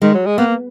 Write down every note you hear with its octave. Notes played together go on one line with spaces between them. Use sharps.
D#3 G#3
F#3
G#3
A#3 B3